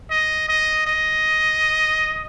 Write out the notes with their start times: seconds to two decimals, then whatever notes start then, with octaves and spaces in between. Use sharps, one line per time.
0.10 D#5
0.49 D#5
0.87 D#5